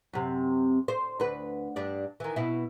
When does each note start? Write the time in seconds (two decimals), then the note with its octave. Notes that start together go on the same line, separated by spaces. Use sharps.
0.13 F#2 C3
0.88 C5
1.20 D2 B4
1.76 G2 D4 D5
2.20 D#3 E3
2.36 B2 E4